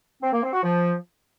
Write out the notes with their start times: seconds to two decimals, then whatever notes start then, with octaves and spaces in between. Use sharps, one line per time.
0.23 C4
0.33 A#3
0.43 C4
0.53 F#4
0.63 F3